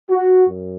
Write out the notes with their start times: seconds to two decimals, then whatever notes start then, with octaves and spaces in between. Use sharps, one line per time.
0.11 F#4
0.48 F#2